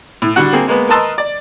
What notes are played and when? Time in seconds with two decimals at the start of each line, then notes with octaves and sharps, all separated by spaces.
0.22 A2
0.36 D3 G3 F#4 F#5
0.53 A#3 C4 G#4
0.68 G#3 A#3 B3
0.89 A#4 B4 D#5 A5 C6 E6
1.18 D5